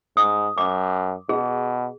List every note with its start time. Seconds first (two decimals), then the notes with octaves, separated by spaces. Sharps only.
0.17 G#2 D#6
0.58 F#2 D6
1.29 B2 G#4